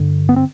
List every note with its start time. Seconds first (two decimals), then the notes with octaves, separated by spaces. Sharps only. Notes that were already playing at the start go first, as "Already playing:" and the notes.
Already playing: G2 D3
0.29 B3
0.36 C4